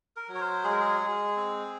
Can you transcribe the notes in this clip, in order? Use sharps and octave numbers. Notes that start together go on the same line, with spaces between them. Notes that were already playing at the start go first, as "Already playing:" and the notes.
A#4
F#3
C#5
C5
G#3 G#4
A#4
G#4
G#3
C4